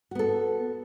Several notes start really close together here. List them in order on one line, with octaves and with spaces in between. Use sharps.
F#4 B3 A4